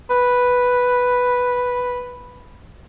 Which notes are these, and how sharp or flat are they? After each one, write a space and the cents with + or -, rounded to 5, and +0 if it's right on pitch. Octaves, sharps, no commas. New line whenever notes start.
B4 +0